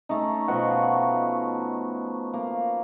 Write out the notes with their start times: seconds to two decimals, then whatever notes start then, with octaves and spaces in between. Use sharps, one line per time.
0.09 A3 C#4 D#4
0.48 B2 F3 B3 F#4
2.34 A#3